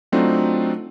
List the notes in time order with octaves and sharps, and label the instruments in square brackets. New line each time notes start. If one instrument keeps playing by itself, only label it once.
[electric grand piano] F#3 A3 C4 D4 D#4 F4